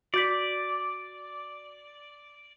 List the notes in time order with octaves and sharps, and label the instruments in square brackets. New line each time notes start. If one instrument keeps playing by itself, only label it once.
[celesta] F#4 G6 B6 [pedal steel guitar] D5